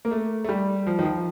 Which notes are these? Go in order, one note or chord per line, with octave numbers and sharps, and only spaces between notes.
A#3
A3
A3
G3
F3
D#3
F3